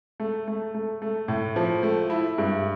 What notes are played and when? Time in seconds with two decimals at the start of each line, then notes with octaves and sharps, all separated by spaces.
0.20 A3
0.48 A3
0.74 A3
1.02 A3
1.28 A2
1.56 F3
1.83 A3
2.10 E4
2.38 G2